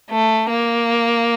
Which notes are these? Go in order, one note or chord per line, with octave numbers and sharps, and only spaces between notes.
A3
A#3